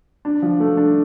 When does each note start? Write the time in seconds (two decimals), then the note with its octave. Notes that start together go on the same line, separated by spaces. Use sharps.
0.25 D4
0.42 F3
0.60 A3
0.77 D4